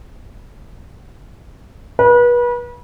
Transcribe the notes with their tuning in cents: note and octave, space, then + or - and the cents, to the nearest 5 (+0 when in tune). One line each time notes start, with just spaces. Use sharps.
B4 -35